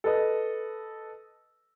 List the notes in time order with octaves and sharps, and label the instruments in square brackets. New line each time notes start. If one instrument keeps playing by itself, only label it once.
[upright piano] A4 B4 D#5